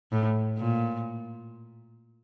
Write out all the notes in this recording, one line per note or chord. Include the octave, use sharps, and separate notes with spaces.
A2
A#2